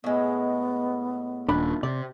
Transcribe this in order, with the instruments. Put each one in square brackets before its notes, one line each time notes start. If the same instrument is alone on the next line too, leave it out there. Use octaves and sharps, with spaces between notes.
[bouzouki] A2 G#3 [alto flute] B3
[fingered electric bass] D#1 [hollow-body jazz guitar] D4 B5
[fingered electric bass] C3 [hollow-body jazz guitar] D5